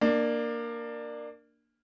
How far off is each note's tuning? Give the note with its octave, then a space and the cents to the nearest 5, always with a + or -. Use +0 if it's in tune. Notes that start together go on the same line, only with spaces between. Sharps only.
A#3 +0 D4 +20